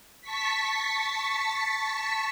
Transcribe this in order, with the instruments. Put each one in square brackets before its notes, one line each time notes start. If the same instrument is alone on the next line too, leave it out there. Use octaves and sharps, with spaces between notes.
[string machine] A5 C#6 B6